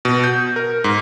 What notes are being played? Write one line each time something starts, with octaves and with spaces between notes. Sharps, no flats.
B2
G6
A#4
G#2